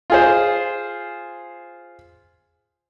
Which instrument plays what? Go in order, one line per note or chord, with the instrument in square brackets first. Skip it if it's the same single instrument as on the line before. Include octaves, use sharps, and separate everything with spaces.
[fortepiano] F4 G#4 C5